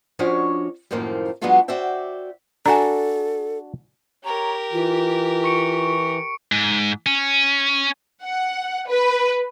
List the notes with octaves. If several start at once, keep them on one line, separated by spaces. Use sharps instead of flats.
F3 C#4 D4 F#4 C#5 D#5
F#2 A2 D#3 F3 A#3 C4
F#3 G#3 B3 D4 F4 F#4
F#4 C5 D5 E5 G5
D4 F#4 A4 G#5 A#5
G4 A#4 C#5 A#5
E3 F4
C#6 C#7 D7
G#2
C#4
F#5
B4